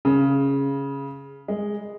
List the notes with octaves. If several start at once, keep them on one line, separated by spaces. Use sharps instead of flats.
C#3
G#3